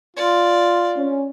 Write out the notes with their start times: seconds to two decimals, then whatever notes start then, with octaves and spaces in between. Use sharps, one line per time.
0.17 F4 D5
0.96 C#4